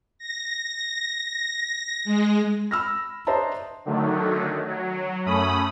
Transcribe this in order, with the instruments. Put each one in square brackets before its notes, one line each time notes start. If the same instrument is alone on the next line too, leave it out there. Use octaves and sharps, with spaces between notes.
[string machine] A#6
G#3
[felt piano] B5 E6 F6 A#6
D4 C5 D#5 E5 A5 A#5
[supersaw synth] D3 D#3 F#3 A3
F#3
F#2 A3 C#4 B5 D#6